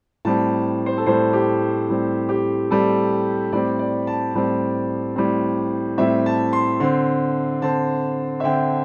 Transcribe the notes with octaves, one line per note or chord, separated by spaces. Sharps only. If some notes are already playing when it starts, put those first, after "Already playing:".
A2 G3 C4 A5
C5
A4
A2 G3 C4 C5
G4
A2 G3 C4
G4
A2 G3 C4 A4
A2 G3 C4 D5
D5
A5
A2 G3 C4
A2 G3 C4
A2 G3 C4 E5
A5
C6
D3 C4 C6
D3 C4 A5
E5
D3 C4 G5